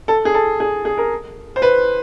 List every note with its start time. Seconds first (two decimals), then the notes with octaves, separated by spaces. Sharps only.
0.08 A4
0.25 G#4
0.34 A4
0.60 G#4
0.85 G#4
0.98 A#4
1.56 C5
1.62 B4